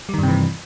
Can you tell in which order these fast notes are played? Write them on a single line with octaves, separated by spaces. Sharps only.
G3 D#3 G2 C3 E3